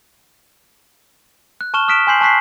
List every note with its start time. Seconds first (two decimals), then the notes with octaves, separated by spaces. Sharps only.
1.61 F#6
1.74 A5 C#6 F6 E7 G7
1.88 D#6 F6 F#6 B6 D7 E7
2.07 G#5 C6 G6 C7 F#7
2.21 A5 C#6 F#6 B6 C7